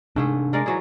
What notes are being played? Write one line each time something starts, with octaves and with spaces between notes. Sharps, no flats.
G#2 C3 A3 D4 G#4
G#3 A#4 D5
E3 F#3 G#4